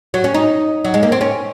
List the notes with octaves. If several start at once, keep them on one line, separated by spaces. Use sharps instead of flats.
F#3
C#4
D#4
F#3
G#3
A#3
C4
C#4